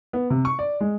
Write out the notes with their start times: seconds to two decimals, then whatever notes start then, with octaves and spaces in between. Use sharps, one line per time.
0.13 B3
0.30 C3
0.45 C#6
0.59 D5
0.80 G#3